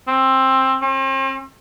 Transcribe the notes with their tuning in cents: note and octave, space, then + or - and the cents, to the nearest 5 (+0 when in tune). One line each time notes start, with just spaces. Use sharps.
C4 +15
C4 +45